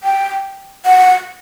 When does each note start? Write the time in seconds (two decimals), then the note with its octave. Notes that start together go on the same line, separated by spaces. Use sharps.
0.03 G5
0.86 F#5